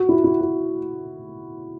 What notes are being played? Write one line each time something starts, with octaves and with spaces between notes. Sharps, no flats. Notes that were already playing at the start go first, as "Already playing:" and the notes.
Already playing: F#4
E4
E4
F#4